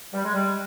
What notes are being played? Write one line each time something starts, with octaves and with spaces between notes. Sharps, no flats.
G3
G#3
G3